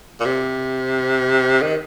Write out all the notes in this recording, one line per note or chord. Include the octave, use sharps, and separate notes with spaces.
A#2
C3
D#3